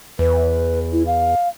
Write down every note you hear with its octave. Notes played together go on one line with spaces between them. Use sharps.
E2 B4
E4
F5